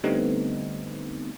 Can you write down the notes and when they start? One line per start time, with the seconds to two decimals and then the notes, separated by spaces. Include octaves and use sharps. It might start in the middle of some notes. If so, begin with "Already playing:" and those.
0.03 D3 G3 A3 B3 C4 D#4